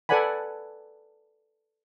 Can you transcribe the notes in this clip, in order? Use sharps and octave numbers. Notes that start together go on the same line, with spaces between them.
A4 B4 D5 F#5 G#5 B5